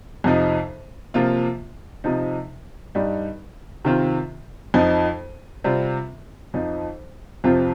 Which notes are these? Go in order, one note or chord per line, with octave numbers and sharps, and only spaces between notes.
F2 C3 F3 D#4
C3 F3 A#3 F4
C3 F3 D#4
G2 G3 D#4
C3 D#3 C4 F4
F2 F3 D#4
C3 G3 C4 F4
F2 F3 D#4
F2 C3 F3 C4 F4